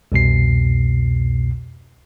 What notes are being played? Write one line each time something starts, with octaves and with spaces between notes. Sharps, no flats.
C2 F2 B2 C7